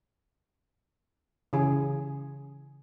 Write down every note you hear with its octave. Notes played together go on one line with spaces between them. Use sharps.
C#3 E3 G#4